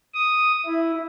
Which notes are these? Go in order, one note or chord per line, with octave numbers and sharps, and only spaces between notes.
D#6
E4